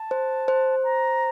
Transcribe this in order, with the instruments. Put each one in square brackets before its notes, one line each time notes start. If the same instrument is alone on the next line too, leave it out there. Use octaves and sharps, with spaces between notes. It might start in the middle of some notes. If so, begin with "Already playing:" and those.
Already playing: [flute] A5
[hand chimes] C5
C5
[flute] A#5